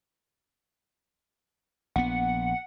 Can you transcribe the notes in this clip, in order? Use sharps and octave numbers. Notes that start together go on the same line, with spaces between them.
A#1 B3 F#5